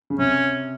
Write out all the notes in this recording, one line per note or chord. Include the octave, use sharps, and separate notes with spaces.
C#3
C3 C#4